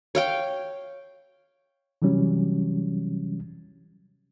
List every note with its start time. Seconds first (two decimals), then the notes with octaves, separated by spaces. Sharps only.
0.15 C#5 F5 G5
2.02 C3 E3 F#3 G3 C#4